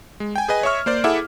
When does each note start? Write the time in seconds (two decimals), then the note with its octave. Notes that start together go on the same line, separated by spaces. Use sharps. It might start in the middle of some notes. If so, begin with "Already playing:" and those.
0.20 G#3
0.36 G5 G#5
0.48 G#4 B4 D#5 G#5
0.63 C#5 D#5 E5 C#6 F6
0.86 A#3 C5 D5
1.04 E4 G#4 A4 E5 F#5 D6